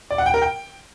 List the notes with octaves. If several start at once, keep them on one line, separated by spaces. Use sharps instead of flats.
D5
F#5
G5
A#4
G5